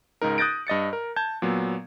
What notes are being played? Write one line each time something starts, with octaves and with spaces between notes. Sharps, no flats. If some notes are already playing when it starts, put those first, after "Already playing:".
C#2 G#2 D#4 A#4
D#6 F#6 G6 A6 A#6 D7
G2 D#5 A6 C#7
A#4
A5 G6 G#6
A#2 F#3 B3